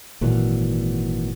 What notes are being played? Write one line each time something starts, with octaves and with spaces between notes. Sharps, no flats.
G#1 A#2 E3 F#3